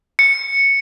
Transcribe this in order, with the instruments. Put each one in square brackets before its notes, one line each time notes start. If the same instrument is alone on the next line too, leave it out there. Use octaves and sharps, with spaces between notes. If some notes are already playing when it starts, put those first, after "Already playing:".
[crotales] C#7